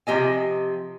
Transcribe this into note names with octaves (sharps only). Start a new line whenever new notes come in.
C3 F3 G4 D#5 G#5